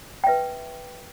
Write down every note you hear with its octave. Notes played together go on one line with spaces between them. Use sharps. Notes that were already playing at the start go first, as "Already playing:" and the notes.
B4 E5 G5